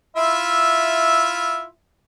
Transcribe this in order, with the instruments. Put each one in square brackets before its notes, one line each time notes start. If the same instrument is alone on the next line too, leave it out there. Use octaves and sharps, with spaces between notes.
[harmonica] E4 F4 E5